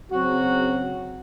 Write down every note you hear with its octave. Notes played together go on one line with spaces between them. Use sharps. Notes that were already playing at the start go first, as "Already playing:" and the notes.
C#3 F#3 C4 F#4